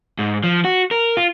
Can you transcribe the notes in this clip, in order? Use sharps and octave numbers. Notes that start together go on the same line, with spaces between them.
G#2
F3
F#4
A#4
F4